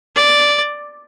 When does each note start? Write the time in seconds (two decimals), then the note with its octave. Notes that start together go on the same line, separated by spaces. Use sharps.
0.16 D5